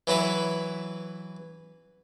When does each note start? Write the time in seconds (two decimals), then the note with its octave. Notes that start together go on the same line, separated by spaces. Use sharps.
0.07 E3 F#3 E4 B4